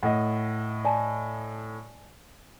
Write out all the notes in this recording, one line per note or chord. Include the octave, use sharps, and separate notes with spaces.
A2 D#5 F#5
D5 G#5 A5